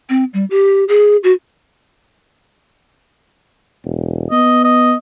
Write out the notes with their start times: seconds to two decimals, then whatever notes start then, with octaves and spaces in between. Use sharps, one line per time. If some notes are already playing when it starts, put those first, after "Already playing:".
0.09 C4
0.34 G3
0.50 G4
0.88 G#4
1.24 F#4
3.84 E1
4.31 B3 D#5
4.65 D#5